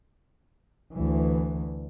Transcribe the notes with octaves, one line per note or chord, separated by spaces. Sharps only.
D2 E3